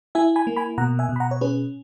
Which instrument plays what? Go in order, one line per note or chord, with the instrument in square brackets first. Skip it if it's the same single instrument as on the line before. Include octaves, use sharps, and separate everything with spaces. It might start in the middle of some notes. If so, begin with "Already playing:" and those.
[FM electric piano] E4 E5 G#5
G#5 B5
A#3
G#5 B5
B2 F#5 A#5
E5 G#5
B2
B5
F#5 A#5
C#5
C#4 G#4 B4